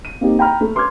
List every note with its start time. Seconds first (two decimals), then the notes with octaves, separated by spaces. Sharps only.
0.05 D#7
0.21 A#3 C4 D#4 G4
0.39 G5 A#5 B5 F6
0.61 A3
0.75 B4 C6 D6 F6 G#6